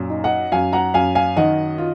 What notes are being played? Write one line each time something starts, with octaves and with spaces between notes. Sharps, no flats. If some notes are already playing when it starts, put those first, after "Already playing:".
Already playing: F#2 A#2
D#4
D#5 F#5
F#2 F5 G#5
F#5 A#5
F#2 F5 G#5
F5 G#5
D#3 D#5 F#5
F4